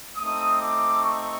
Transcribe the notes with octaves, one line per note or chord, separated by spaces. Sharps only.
A3 C4 D#4 D#6
D6
C#6